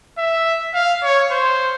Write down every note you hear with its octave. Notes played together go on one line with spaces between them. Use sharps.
E5
F5
C#5
C5